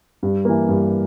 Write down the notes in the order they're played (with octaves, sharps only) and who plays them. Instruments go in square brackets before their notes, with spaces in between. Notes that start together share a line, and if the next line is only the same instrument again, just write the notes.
[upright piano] G2
E3 A#3
G2